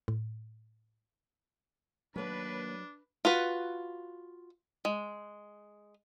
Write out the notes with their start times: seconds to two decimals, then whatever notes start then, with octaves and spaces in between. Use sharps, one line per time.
0.08 A2
2.16 D#2 F#3 A#3 D4 B4
3.25 F4 F#4 B4
4.85 G#3